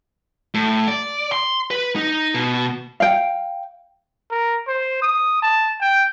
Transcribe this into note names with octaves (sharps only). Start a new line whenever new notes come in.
A2
D5
C6
B4
D#4
B2
F5 G5
A#4
C5
D#6
A5
G5